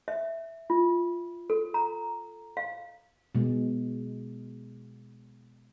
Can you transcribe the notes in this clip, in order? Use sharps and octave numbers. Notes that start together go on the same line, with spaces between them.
E5
F4
A4
A#5
F5
B2 G#3